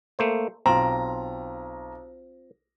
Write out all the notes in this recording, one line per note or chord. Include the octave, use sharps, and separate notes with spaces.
A3 A#3 C5
B1 C4 F4 A#5